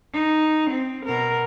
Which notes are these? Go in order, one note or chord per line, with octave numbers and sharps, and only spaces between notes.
D#4
C4
B2 A#4